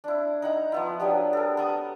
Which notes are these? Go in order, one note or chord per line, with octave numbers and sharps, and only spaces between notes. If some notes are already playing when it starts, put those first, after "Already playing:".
D4 E4
D#4 F#5 A#5
F3 B3 E4
F#3 B3 D4 G4
A4 A#4
B3 A#5 D#6